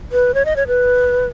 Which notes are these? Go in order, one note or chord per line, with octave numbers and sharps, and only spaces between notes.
B4
C#5
D#5
C#5
B4